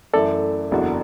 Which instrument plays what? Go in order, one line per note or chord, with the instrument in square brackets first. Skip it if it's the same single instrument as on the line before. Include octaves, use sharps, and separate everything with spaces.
[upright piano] F#2 E3 A3 E4 [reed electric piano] A4 D5
[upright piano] F#1 E2 E3 D4 F#4